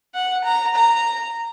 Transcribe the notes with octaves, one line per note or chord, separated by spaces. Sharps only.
F#5
A#5
A#5